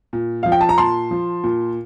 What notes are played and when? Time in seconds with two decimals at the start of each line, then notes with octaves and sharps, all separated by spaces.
0.13 A#2
0.43 F3 F5
0.52 G5
0.61 A5
0.69 A#5
0.78 A#2 A5 C6
1.11 F3
1.44 A#2